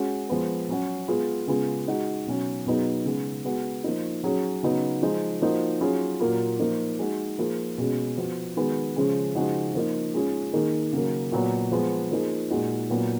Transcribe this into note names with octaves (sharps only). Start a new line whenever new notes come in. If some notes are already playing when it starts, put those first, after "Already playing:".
Already playing: G#3 C#4 F#4
F3 G#3 B3
F#3 C#4 F#4
G#3 B3 F4 G#4
C#3 G#3 B3 F4 G#4
G#3 D#4 F#4
B2 F#3 C#4 F#4
B2 F#3 B3 D#4 G#4
C#3 G#3 B3
G#3 B3 F#4
F3 A#3 D#4
F#3 C#4 G#4
C#3 F#3 B3 D#4
F3 G#3 D#4
F3 A#3 D#4 F#4
F#3 C#4 F4 G#4
A#2 F#3 A#3 F4
F3 A#3 D#4
G#3 D#4 F#4
F3 A#3 F4 G#4
B2 G#3 C#4 G#4
F3 B3 F#4
D#3 G#3 B3 F#4
C#3 F3 G#3 C#4 G#4
C#3 F3 G#3 D#4 F#4
F3 A#3 D#4
G#3 C#4 F4 G#4
D#3 A#3 D#4 G#4
C#3 F#3 A#3
A#2 F#3 B3 F#4
F3 G#3 B3
F3 A#3 D#4 G#4
A#2 G#3 D#4 F#4
A#2 F#3 B3